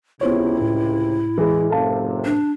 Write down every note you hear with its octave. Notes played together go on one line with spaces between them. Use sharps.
C#2 C3 B3 E4 C5 C#5
A2
E3 G#3
F#1 C3 A4 F5 A5
D4